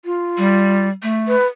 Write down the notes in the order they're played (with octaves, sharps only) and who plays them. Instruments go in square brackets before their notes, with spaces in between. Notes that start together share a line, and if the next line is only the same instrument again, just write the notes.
[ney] F4
[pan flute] G3
A3
[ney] B4